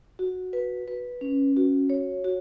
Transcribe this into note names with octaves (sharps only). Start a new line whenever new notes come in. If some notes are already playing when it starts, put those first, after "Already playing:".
F#4
B4
B4
C#4
F#4
C#5
F#4